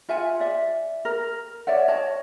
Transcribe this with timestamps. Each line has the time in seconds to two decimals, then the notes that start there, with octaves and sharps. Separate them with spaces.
0.09 F4 E5 F#5 G#5
0.40 D5 E5
1.05 A#4
1.67 C#5 D5 E5 F#5
1.88 C#5 D#5 A5